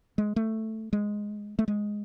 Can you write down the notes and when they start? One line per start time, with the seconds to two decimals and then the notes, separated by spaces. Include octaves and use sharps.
0.18 G#3
0.36 A3
0.93 G#3
1.59 A3
1.68 G#3